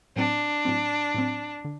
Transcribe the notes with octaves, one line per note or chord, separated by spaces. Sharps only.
A2 F#3 C4 D4
A2 F#3 C4
A2 F#3 C4
D3